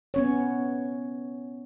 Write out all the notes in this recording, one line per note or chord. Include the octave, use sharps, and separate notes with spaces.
B3 C#4 C#5